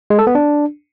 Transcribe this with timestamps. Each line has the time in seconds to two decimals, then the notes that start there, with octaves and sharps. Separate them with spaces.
0.10 G#3
0.19 A4
0.27 B3
0.35 D4